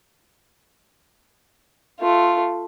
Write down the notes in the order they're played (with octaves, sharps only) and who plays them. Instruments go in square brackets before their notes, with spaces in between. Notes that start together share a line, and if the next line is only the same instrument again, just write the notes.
[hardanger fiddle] A3 F4